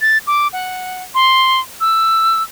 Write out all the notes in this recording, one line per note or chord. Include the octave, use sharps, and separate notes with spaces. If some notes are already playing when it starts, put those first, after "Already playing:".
A6
D6
F#5
C6
E6